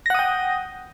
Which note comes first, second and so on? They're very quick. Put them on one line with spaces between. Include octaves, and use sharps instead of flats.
A#6 F#5 D#6 G5